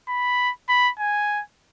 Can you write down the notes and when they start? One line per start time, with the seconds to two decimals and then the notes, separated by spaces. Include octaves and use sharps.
0.08 B5
0.69 B5
0.99 G#5